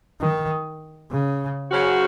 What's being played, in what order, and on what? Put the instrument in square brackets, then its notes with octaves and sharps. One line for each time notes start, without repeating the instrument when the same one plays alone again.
[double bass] D#3
C#3
[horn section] C#3 F#3 C#4 F#4 C5